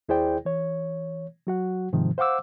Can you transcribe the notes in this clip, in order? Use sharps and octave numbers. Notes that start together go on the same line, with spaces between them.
D#2 E4 G#4 C5 D5 G5
E3 C#5
F#3 F#4 F#5
G#2 C3 D#3 F3
C5 F5 F#5 D6 E6